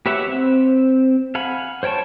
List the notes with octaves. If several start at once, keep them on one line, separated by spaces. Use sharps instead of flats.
G4 B4 C#5 E5 F#5
C4
F5 F#5 G#5 B5
C5 C#5 G5 A5 C#6